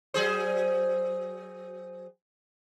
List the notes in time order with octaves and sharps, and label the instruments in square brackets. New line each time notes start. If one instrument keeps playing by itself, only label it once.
[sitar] F#3 G#4 C5